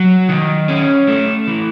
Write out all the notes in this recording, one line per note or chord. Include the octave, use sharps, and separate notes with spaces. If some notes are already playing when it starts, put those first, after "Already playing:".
Already playing: F#3
D#3
C#4
A3
E3